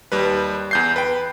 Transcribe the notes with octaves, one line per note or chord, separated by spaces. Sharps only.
D#2 G3 B4
E2 G6 C7
B4 G5